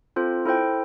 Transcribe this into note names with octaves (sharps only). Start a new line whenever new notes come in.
C4 F4 A4 C5
E4 A4 C5 G5